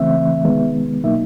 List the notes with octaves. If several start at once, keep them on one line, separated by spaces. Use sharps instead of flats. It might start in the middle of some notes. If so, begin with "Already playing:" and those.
Already playing: C#3 E3 A3 C4 E5
C3 D#3 G#3 B3
B2 F#3 A#3 D#4 E5